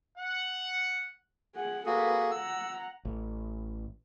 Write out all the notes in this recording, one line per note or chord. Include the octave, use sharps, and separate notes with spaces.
F#5
G#4 F#5
A#3 F#4 G#4 A4 B4
F#5 A#5 E6
A1